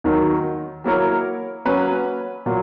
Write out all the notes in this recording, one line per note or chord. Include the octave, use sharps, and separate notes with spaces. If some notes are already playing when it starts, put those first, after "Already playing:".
D#2 D#3 F#3
F#3 A#3 E4 A#4 C#5
F#3 A#3 C#4 F#4 B4
A#2 F#3